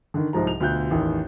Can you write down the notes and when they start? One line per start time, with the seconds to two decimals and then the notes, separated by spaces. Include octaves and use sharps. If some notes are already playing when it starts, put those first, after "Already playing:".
0.14 D3 D#3
0.33 C2 G#2 F3 A#5
0.47 F7
0.60 D2 B2 F4 F#6 G6
0.91 A1 E2 D#3